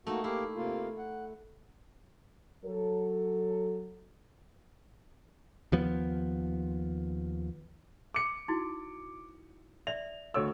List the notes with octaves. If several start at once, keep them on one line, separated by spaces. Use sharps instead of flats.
A3 A#3 D#4 F#4
A#3 E4 G4 F5
C3 A#3 F4
F#5
F#3 A4
D#2 F3 B3
D6 C#7
D#4 E4 F#4
D5 E5 F7
D2 A4 C#5 D#5 E6